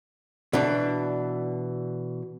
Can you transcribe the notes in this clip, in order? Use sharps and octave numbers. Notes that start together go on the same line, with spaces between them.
B2 E3 D4